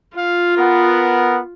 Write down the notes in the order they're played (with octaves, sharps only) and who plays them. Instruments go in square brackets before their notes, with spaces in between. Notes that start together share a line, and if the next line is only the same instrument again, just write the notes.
[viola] F4 [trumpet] F5
[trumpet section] B3 [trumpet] A#4